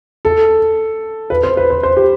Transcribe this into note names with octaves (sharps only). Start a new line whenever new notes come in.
A4
B4
C5
B4
C5
C5
G4